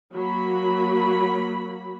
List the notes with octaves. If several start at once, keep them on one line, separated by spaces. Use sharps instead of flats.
F#3 A#3 F#4 B5